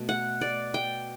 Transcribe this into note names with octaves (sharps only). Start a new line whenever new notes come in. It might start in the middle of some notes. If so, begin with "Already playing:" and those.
Already playing: B2 A3
F#5
D5
G5